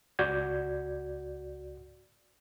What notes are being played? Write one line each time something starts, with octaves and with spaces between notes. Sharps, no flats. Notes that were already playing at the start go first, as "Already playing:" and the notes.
C#2 F#4 D5 G6 G#6